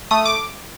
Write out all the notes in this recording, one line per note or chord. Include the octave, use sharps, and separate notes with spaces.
A3 D#6
D6